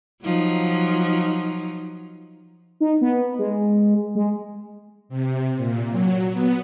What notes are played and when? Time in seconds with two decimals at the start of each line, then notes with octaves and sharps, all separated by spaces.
0.24 F3 F#3 D#4
2.81 D#4
3.01 B3
3.39 G#3
4.15 G#3
5.09 C3
5.57 A#2
5.91 F#3
6.32 B3